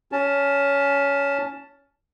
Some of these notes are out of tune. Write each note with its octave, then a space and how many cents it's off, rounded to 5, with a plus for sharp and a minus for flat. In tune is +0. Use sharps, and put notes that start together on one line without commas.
C#4 +20 A5 +0